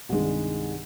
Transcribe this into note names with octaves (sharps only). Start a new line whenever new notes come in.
C2 G2 D#3 G#3